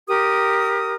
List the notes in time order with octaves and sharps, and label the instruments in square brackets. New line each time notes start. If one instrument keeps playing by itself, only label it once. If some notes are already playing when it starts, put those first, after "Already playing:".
[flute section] G4 A#4 D#6